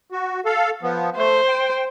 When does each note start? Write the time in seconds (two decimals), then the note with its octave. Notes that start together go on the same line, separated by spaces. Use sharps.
0.12 F#4
0.45 A4 F5
0.82 F3 B3
1.17 A3 C5
1.48 G5